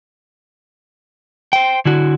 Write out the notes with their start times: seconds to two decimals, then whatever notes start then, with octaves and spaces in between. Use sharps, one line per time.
1.53 C5 G5
1.85 D3 E4 F#4